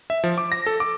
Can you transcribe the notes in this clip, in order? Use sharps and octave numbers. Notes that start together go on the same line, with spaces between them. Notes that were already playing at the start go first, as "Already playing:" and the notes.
E5
F3
D6
A#6
A4
D6